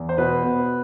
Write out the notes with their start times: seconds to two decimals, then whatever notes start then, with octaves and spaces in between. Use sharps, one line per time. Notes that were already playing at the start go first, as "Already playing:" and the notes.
Already playing: E2
0.09 C5
0.18 B2 B4
0.44 B2